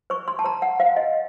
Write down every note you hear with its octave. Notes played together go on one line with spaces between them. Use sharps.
C5 C#6
C6
A5
C5 A#5
F#5
C5 F5
D#5